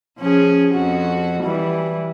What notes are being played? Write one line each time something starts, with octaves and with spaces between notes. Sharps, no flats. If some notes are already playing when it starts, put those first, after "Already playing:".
F3 C#4 G#4
F2 F#4
E3 G3